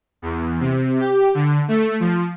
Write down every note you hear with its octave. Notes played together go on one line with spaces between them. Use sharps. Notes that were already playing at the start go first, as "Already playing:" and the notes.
E2
C3
G4
D3
A3
F3